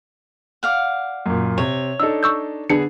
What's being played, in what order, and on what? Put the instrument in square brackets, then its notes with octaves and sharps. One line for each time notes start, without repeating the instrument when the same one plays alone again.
[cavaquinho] D5 F5 F#5
[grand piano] F#2 A#2
[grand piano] C3 [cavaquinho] C#5
[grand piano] D4 D#4 A4 [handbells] E6
[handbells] C#6 E6 G6
[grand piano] D3 B3 G#4 [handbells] D4 C#7